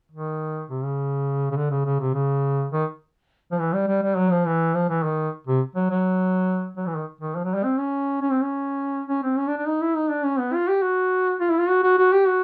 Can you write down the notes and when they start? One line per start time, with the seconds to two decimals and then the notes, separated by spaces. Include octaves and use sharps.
0.12 D#3
0.70 C3
0.84 C#3
1.51 C#3
1.56 D3
1.71 C#3
1.85 C#3
2.00 C3
2.14 C#3
2.72 D#3
3.52 F3
3.59 E3
3.73 G3
3.88 G3
4.02 G3
4.17 F#3
4.31 F3
4.46 E3
4.74 F3
4.89 E3
5.03 D#3
5.47 C3
5.75 F#3
5.90 F#3
6.77 F#3
6.87 E3
6.97 D#3
7.21 D#3
7.36 F3
7.45 F#3
7.54 G3
7.64 C4
7.78 C#4
8.22 C#4
8.31 C4
8.42 C#4
9.08 C#4
9.23 C4
9.38 C#4
9.47 D4
9.57 D4
9.66 D#4
9.81 E4
9.96 D#4
10.10 D4
10.24 C#4
10.39 B3
10.53 F4
10.69 G4
10.82 F#4
11.41 F4
11.50 E4
11.59 F4
11.69 F#4
11.83 F#4
11.98 F#4
12.13 G4
12.27 F#4